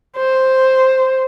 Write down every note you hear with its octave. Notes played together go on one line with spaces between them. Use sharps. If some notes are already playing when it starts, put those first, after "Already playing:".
C5